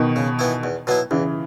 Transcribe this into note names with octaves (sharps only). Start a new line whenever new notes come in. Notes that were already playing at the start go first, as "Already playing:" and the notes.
Already playing: B2 D#3
C#3
E3 B3 E4
E2
B2 F#3 B3 E4
E2 C#3 E3